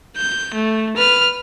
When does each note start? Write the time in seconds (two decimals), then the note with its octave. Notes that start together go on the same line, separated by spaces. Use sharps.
0.17 G6
0.54 A3
0.97 B4 F6